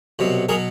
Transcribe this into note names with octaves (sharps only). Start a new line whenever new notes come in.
C2 B2 F#3
B2 F#3 G#4 A#4